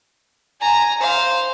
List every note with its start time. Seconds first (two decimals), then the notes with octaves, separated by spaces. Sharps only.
0.61 G#5 A#5
1.01 C5 F5